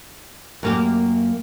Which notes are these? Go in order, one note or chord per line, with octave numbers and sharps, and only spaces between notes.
F#2 A#3 G4